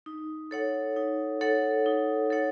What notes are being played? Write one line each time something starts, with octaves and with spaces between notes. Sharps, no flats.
D#4
A4 C#5 F#5
D#4
A4 C#5 F#5
D#4
A4 C#5 F#5